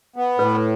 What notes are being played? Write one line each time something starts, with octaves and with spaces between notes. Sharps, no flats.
B3
A2 B4